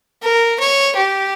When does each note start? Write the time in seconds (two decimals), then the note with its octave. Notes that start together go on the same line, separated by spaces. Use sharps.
0.23 A#4
0.60 C#5
0.96 G4